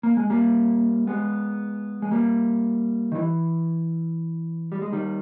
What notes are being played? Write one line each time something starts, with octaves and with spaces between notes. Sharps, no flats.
A#3
G#3
G3 A#3
G#3 B3
G#3
G3 A#3
D#3
E3
G3
G#3
D#3 G3